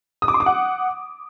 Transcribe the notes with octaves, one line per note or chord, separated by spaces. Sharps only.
D#6
D6
C6
D6
F#5